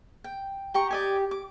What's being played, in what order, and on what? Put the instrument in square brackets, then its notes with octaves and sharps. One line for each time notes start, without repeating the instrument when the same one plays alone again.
[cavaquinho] G5
[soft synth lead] G4 [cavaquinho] G5 A#5 C#6
[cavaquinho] D5 D#5 G#5
D6